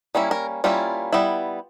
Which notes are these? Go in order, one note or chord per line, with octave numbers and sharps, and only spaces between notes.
G3 A#3 C#4 E4
A#4
G3 A#3 C#4 E4 F4
G3 B3 E4